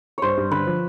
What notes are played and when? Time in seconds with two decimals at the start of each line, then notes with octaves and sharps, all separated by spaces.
0.18 G2 C5 C#5
0.37 G2
0.51 D3 B4
0.67 F3